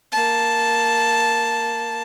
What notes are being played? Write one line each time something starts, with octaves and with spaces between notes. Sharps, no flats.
A#3 A5